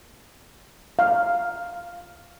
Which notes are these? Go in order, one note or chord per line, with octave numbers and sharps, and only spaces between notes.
F5